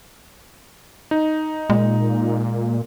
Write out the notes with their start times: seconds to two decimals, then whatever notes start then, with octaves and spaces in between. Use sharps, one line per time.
1.11 D#4
1.70 A#2 G#3